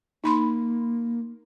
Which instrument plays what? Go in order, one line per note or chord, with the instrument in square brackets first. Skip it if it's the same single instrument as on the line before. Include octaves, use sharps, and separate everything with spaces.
[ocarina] A#3 [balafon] D#4 B5 C6